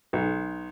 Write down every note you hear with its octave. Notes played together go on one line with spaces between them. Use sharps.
B1